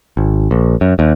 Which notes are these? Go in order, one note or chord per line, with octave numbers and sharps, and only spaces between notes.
G#1
A#1
F#2
D#2